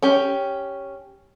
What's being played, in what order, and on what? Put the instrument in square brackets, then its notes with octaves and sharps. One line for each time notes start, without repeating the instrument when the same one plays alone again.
[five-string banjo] C#4 G4